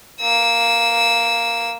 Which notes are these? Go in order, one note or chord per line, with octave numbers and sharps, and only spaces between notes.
A#3 E6